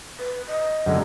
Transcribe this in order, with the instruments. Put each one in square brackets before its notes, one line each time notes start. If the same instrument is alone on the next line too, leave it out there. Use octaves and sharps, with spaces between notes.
[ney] B4
D#5
[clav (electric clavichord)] F#2 D3 G#3